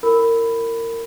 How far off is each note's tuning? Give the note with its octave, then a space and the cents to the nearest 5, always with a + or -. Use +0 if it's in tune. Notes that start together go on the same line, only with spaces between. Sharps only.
E4 +20 A#4 -25 B5 +5